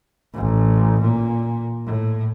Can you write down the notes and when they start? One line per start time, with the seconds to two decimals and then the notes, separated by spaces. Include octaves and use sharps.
0.34 A1
1.01 A#2
1.86 A2